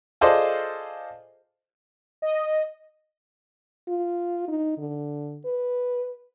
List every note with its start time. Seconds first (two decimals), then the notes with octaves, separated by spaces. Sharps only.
0.21 F4 G#4 A4 C5 D5 D#5
2.22 D#5
3.88 F4
4.48 D#4
4.78 D3
5.45 B4